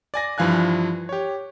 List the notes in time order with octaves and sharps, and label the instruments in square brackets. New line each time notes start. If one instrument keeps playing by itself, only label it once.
[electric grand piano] D5 G#5 A#6
G2 E3 F3 F5 G#5 F#6
G4 C#5